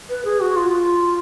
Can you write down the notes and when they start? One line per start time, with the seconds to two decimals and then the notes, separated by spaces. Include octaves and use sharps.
0.10 B4
0.25 G#4
0.40 F#4
0.56 F4